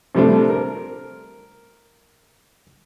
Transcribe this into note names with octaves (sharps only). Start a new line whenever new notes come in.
C3 F3 G3 A3 C4 D4
A#4